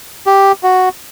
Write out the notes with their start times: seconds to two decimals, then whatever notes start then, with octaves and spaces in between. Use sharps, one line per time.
0.26 G4
0.63 F#4